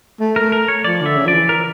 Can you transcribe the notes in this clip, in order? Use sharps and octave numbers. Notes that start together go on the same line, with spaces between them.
A3
A3 A#4
A#4
C#5
F3 D5
D3 E5
C#3
F3 D5
E3
A#4